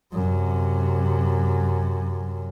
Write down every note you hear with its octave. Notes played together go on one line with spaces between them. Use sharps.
F#2 C3